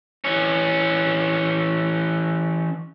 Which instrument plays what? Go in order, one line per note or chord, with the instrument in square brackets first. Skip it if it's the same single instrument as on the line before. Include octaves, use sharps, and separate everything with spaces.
[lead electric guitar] E3 C#4